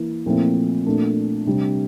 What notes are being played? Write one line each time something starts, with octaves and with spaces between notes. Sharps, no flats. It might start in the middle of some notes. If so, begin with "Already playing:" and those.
Already playing: E3 A#3
A#2 F3 A3 C4 E4
A#2 A3 D4
C3 G3 D4